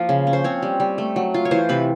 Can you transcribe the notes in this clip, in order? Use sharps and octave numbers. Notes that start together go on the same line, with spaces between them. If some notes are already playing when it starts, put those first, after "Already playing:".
Already playing: F3 A#3 F4
C#3
C#4
C5
C4 C#5
G3
G3
A3
F#3
F4
C#5
E3 C5
C3 B4